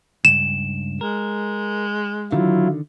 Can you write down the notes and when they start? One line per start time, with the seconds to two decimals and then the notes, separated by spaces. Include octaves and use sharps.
0.25 C#2 G2 E7
1.01 G#3 A#4
2.32 D3 D#3 F#3 E4 F4